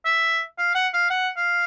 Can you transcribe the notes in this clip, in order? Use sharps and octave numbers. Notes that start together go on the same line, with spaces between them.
E5
F5
F#5
F5
F#5
F5